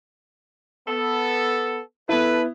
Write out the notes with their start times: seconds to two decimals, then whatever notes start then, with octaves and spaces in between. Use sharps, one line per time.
0.88 B3 A4
2.09 B3 E4 A4 B4